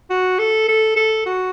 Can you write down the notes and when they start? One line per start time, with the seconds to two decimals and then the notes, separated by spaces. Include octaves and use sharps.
0.10 F#4
0.39 A4
0.68 A4
0.96 A4
1.26 F#4